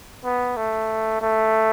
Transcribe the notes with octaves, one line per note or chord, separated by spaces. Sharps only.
B3
A3
A3